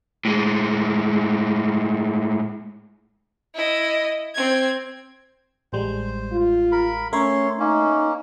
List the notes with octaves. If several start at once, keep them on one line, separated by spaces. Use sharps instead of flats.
A2 G#3
E4 D#5
C4 G#6
A1 G3 G#3 C5
F4
A#4 B5
A3 C#4 A#4 C#5 E5 C6
A#3 C#4 D#4